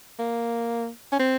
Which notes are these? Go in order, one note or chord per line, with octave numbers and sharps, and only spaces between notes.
A#3
C#4
C4